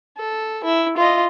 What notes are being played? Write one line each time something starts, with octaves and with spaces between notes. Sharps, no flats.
A4
E4
F4 D#5